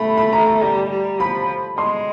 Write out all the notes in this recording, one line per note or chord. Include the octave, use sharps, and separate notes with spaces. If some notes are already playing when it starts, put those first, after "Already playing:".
Already playing: A3 B5
B5
A#5
A#5
G3 A#5
G3
F3 B5
G#3 C6